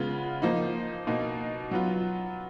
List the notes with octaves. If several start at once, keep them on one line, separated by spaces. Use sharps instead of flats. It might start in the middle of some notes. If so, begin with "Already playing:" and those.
Already playing: C#3 G#3 B3 F4
F3 A#3 D#4
B2 A#3 D#4
F#3 B3 F4